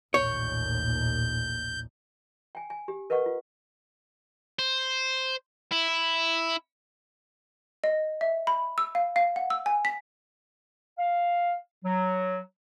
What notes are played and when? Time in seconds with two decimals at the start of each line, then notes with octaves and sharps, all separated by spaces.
0.14 A1 D#2 A#2 C#5 G6
2.55 G5 G#5
2.70 G#5
2.88 G4
3.10 A#4 B4 D#5 F#5 C#6
3.26 F4
4.59 C5
5.72 E4
7.84 D#5
8.21 E5
8.47 B5
8.78 E6
8.95 F5
9.16 F5
9.36 F#5
9.50 E6
9.66 G#5
9.85 B6
10.99 F5
11.85 F#3